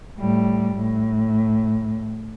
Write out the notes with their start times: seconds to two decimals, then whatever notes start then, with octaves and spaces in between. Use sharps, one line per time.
0.19 A2 G3
0.75 A2